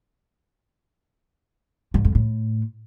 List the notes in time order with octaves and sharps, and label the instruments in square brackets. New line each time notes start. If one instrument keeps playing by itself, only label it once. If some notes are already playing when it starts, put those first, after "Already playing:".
[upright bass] G#2
F2
A2